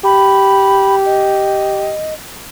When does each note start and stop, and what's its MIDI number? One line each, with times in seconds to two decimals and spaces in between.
0.04 1.93 67
0.04 0.95 83
1.05 2.13 75